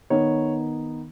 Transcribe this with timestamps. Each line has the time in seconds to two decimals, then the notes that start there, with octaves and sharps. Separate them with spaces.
0.10 D#3 B3 D#4 C#5